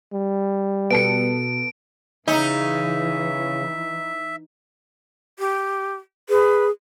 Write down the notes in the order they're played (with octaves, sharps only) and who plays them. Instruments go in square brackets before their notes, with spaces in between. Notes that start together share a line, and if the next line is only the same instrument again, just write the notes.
[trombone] G3
[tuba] B2 [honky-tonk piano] B3 A4 C#7 [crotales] D7
[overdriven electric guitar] C#3 C#4 [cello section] E3 [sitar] D#4 [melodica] E5
[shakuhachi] G4
[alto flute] G#4 [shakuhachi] B4